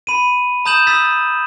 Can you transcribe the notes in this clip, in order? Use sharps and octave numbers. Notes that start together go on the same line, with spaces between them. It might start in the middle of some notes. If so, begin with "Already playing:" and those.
B5 D#7
A#5 D#6 G6 E7 F#7
D#6 E6 A6 B6